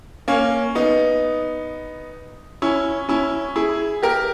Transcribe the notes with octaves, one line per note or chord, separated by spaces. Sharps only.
A#3 C#4
B3 D#4
C#4 E4
C#4 E4
E4 G#4
G4 A#4